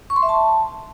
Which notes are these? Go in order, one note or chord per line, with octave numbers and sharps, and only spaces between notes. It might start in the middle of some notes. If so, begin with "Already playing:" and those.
C#6
C6
E5
A5